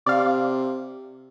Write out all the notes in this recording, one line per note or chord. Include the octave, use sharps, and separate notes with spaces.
C3 D5 F5